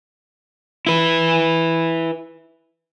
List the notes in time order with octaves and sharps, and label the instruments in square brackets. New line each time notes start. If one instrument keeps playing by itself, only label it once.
[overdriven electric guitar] E4 B4